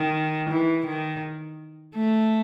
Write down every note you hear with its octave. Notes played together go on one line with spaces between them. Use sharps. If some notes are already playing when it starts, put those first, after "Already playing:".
Already playing: D#3
E3
D#3
A3